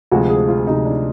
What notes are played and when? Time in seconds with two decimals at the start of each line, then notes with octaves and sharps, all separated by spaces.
0.12 D2 C3 F3 G#3 F#4
0.30 G#4
0.48 F4
0.67 D2 C3 F3 G#3 D#4
0.85 D4